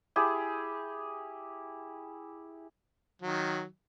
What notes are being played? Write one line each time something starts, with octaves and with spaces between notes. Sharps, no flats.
E4 G4 G#4
D#3 F#3